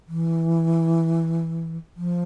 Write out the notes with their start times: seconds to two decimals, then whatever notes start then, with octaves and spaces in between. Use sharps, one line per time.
0.08 E3
1.96 F3